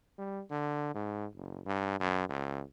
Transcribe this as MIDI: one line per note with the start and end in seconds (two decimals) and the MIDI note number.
0.18 0.42 55
0.51 0.94 50
0.95 1.26 44
1.35 1.60 30
1.66 1.95 43
2.00 2.29 42
2.29 2.61 37